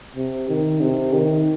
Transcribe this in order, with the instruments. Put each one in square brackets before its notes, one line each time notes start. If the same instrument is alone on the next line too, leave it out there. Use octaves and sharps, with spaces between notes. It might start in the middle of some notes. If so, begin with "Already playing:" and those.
[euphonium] C3
D#3
C3
D#3